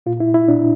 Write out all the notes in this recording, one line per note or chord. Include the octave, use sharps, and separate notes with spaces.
A#2 F4
E4
E4
A#2 D4